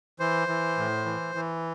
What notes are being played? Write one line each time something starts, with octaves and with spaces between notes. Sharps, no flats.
E3 C5
E3
A2
E3
E3